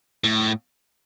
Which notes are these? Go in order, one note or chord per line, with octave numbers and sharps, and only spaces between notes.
A2